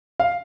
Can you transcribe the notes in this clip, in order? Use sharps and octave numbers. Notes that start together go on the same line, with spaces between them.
F5